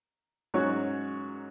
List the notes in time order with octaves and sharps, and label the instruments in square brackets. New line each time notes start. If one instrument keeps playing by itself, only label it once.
[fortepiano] G#2 F#3 C#4 F#4 [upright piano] C#5